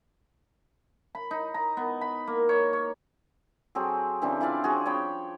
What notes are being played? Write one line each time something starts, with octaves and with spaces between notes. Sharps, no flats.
B5
D#4
A#5
B3
B5
A#3
C#5
C#5
F#3 C4 G#4 A4
C#3 E3 C4 D4
E4 F4 D5 F5
F3 C4 F#4 G#4
C#5 G5 B5